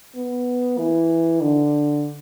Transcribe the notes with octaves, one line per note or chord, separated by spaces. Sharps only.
B3
E3
D3